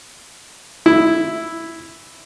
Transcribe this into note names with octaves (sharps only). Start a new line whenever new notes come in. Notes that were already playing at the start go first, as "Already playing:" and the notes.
E4